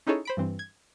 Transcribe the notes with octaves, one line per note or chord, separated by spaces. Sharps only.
C#4 D#4 E4 G#4 A4 C#5
C5 B5 D7
G2 E3 C4
G#6